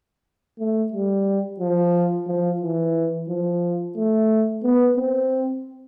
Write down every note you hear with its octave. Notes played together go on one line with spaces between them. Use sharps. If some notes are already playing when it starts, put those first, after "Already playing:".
A3
G3
F3
F3
E3
F3
A3
B3
C4